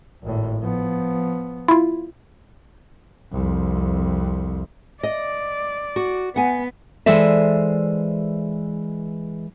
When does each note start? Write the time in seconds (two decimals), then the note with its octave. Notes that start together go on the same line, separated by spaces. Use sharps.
0.24 G#1 A2
0.61 F3 B3
1.68 E4 F4
3.32 C2 F2
5.03 D5 D#5
5.96 F#4
6.36 B3 F#5 G#5
7.06 E3 G#3 A4 C5 D5 E5